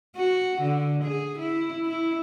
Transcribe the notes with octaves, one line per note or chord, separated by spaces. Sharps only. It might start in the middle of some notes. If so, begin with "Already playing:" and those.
F#4
D3
G#4
E4
E4